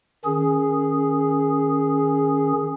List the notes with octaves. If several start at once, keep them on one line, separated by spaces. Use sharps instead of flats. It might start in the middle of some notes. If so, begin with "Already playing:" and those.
D#3 C#4 G#4